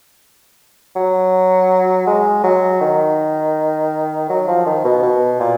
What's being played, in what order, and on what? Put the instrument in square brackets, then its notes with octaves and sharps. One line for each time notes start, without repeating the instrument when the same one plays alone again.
[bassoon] F#3
G#3
F#3
D#3
F#3
F3
D#3
B2
B2
A#2